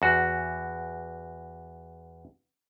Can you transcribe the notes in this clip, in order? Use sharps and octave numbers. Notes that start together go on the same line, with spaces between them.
E2 F#4